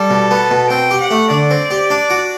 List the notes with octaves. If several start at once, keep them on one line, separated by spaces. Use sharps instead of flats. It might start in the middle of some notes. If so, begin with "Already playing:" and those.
Already playing: G3 A4
B2
B3
B2
C4 G5
G4
F#5
A3
D3 D5
C4
G4
D4
F#4